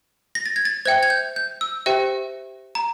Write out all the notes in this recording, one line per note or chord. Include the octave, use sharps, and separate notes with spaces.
A#6
A6
G#6
A6
C5 E5 G5 G#6
G#6
G6
G6
E6
G4 C5 E5 G5
A#5